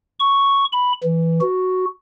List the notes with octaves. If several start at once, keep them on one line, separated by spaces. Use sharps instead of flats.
C#6
B5
E3
F#4